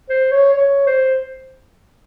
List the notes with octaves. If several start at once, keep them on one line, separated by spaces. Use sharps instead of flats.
C5
C#5
C#5
C5